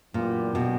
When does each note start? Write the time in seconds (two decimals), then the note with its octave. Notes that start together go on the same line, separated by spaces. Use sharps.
0.13 F#2 A#2 E3 B3 D4 G4
0.55 B2